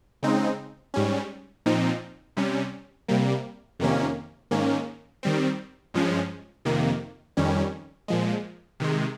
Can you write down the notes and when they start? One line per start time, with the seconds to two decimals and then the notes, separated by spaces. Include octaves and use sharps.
0.23 C#3 G#3 C4 D#4
0.94 G#2 G3 C#4
1.66 A#2 F3 C4 D#4
2.37 C3 G3 C#4
3.08 C3 G3 A#3
3.80 F2 C3 D#3 A#3 C#4
4.51 G#2 D#3 A#3 C#4
5.23 D#3 G3 C4
5.94 G2 F3 G#3 C#4
6.65 F2 C3 D#3 A#3
7.37 F2 D#3 G3 C#4
8.08 A#2 F3 G#3
8.80 C3 D#3 G#3